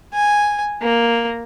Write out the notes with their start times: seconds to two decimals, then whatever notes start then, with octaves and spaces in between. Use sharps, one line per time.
0.14 G#5
0.82 A#3